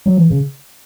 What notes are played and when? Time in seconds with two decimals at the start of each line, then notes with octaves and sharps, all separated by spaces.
0.06 F#3
0.17 E3
0.30 C#3